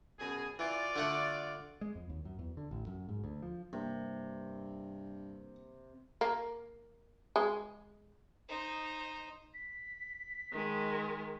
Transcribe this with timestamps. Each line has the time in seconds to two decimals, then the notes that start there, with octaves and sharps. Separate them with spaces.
0.19 F#2 B2 G#4
0.59 E3 F4 F#4 D5
0.96 D3 A3 F#5
1.81 G#3
1.95 F2
2.10 D#2
2.25 F#2
2.39 E2
2.57 D3
2.71 A1
2.87 F#2
3.09 G#2
3.24 D2
3.42 F3
3.73 G2 C3 A#3
6.21 A#3
7.36 G#3
8.49 D#4 C5
9.54 B6
10.52 D#3 G#3